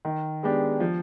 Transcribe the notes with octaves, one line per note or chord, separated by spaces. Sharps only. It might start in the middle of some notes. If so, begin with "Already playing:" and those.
D#3
G#3 B3 D4 G4
F3